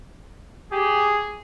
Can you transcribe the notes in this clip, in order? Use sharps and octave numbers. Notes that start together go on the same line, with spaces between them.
G4 G#4